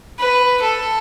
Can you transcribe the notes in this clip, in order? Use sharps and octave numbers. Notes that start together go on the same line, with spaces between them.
B4
A4